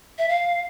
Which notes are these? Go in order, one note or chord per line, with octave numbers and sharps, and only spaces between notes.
E5
F5